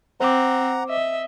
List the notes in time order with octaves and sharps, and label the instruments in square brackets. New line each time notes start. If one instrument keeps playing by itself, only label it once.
[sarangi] C4 [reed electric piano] C5 D6 [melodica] F#5 A#5
[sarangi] D#5 [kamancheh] E5